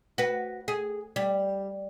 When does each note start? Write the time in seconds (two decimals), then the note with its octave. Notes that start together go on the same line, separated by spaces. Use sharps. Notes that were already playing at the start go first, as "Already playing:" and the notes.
0.18 F#4 B4
0.68 G#4
1.16 G3